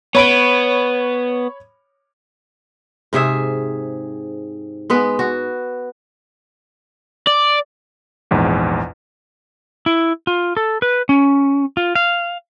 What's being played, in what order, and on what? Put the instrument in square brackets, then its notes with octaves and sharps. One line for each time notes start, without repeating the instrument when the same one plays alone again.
[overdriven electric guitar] B3 [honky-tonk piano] C#5 B5 D7
[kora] G#2 C3 G#4 E5
G#3 B3 B4
F#4
[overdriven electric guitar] D5
[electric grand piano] A#1 E2 G#2
[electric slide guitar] E4
F4
A4
B4
C#4
F4
F5